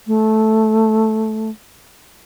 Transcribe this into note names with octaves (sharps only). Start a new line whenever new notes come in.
A3